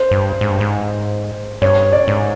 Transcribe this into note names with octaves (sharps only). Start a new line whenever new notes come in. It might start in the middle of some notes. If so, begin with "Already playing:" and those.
Already playing: C5
G2
G#2
G2
G#2
G2 C#5
D5
G#2